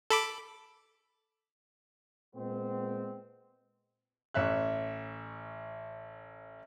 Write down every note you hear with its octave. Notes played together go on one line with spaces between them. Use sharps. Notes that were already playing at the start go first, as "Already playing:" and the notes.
A4 B5 D6
A#2 G#3 B3 C4
A1 C#5 E5 F#6